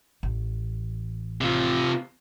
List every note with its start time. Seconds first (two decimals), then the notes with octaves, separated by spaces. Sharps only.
0.23 A1
1.41 C3 F4